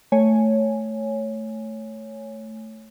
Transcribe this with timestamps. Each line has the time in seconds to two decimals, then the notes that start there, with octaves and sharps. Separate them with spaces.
0.12 A3 C#5 G#5